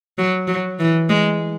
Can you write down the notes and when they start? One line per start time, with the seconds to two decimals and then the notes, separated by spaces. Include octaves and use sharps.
0.18 F#3
0.48 F#3
0.79 E3
1.09 G#3